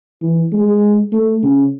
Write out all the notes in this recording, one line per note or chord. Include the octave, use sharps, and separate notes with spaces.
E3
G#3
A3
C#3